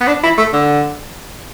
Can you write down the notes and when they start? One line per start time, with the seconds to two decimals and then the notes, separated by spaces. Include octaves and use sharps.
0.01 B3
0.07 D4
0.23 E4
0.38 A3
0.53 D3